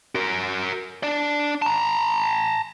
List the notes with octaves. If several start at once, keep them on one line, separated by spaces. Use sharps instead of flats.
F#4 A#4
D4 D5
A5 A#5